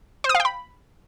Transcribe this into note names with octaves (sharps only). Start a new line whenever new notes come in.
C5
D#6
F5
G5
B5